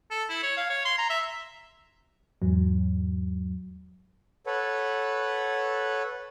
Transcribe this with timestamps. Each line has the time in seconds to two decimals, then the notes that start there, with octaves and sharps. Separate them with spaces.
0.11 A4
0.29 E4
0.43 C#5
0.57 F5
0.70 C#5
0.85 C6
0.98 A#5
1.10 E5
2.42 E2 G#2 F#3
4.47 A4 B4 C#5 F#5